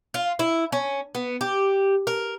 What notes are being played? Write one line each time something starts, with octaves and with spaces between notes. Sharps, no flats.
F4
E4
C#4
B3
G4
A#4